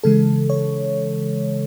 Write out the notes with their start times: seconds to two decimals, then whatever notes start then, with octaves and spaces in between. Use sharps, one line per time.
0.04 C#3 E3 G#3 A4
0.50 C#5